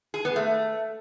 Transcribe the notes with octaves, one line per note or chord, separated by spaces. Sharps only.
G#4
B3
A3